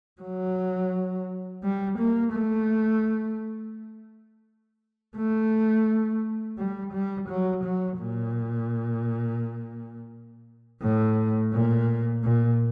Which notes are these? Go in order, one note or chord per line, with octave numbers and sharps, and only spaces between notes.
F#3
G3
A#3
A3
A3
G3
G3
F#3
F#3
A#2
A2
A#2
A#2